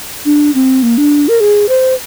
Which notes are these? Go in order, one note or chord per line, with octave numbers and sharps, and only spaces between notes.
D4
C4
A#3
D4
A#4
G#4
C5